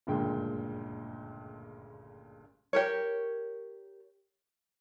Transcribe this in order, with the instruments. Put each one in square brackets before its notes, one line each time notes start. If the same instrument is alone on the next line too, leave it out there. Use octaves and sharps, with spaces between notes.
[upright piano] F#1 D2 G2 A#2 G#3 G5
[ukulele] G4 A#4 C#5